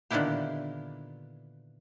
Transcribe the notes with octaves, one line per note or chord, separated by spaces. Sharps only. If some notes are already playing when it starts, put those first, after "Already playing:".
A#2 D3 D#3 B3 E4 G4